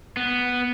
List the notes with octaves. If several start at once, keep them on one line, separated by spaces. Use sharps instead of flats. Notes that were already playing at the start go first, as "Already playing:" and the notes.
B3